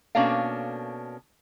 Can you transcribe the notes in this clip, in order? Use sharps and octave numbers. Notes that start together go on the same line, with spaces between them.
B2 A#3 C#4 D4 A4 F5